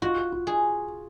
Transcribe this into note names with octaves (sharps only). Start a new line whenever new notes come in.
F4 F#4
F4
G#4